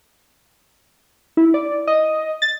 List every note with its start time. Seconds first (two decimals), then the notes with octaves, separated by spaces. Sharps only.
1.37 E4
1.54 D5
1.87 D#5
2.42 A6